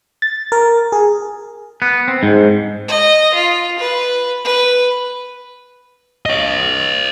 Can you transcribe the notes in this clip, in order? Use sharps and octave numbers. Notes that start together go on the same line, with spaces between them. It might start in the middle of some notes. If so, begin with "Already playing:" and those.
A6
A#4
G#4
B3
C4
G#2
D#5
F4
B4
B4
C#5 D#5